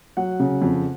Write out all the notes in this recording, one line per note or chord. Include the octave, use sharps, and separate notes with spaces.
F#3 F#5
C#3
F2